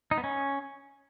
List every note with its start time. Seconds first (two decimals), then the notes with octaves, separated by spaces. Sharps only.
0.11 D#4
0.18 B3
0.24 C#4